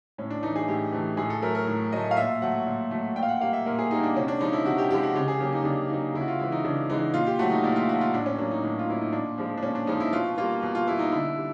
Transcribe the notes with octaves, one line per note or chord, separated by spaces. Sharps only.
A2 C#4
D4
E3 A3 D#4
G#4
A2 G4
E3 A3
A2 G#4
A4
F#3 A3 A#4
A#4
A2
F#3 A3 D#5
F5
A#2 E5
F#3 A3 F#5
A#2
F#3 A3
A#2 G5
F5
F#5
G3 A#3 F5
E5
A#2 A#4
G#4
G3 A#3 D#4
D4
C3 C#4
D4
F3 G#3 D#4
E4
C3 F#4
G4
F3 G#3 G4
F#4
C#3 G4
G#4
F#3 A#3 G4
D#4
C#3 D4
F#3 A#3 D#4
C#3 E4
F#4
F4
E3 G#3 E4
D#4
C#3 D4
E3 G#3 D#4
A#2 F4
G4
F#3 A3 F#4
D#4
A#2 E4
F4
F#3 A3 F#4
F4
A2 D4
C#4
F#3 A#3 D4
D#4
A2
F4
F#3 A#3 E4
D#4
A#2 D4
F3 G#3
D4
A#2 C#4
D4
F3 G#3 D#4
E4
B2 F4
G3 A#3 F4
B2
F4
G3 A#3 E4
D#4
D3 E4
G3